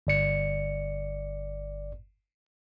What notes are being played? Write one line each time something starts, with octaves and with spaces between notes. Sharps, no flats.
G1 D5 C#7